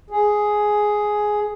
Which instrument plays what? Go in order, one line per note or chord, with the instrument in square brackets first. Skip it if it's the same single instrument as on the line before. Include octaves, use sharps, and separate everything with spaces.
[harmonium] G#4